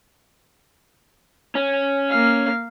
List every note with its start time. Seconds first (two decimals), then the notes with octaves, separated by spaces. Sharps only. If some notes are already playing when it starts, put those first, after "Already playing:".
1.55 C#4
2.09 A#3 F5